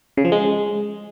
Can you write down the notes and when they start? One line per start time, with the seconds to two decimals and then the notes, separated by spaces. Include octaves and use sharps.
0.17 C#3
0.25 F3
0.32 G#3